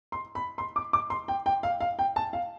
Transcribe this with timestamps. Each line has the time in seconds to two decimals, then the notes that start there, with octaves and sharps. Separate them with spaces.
0.12 C6
0.35 B5
0.58 C6
0.76 D6
0.93 D6
1.10 C6
1.28 G5
1.46 G5
1.63 F5
1.81 F5
1.99 G5
2.16 A5
2.33 F5